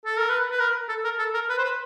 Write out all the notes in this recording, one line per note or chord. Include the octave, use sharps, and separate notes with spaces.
A4
A#4
B4
B4
A#4
A4
A#4
A4
A#4
B4
C5
B4